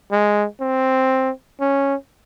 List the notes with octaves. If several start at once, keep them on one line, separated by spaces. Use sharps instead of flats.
G#3
C4
C#4